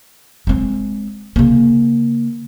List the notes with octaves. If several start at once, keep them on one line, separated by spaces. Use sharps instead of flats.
G#3 C4
C#3 A#3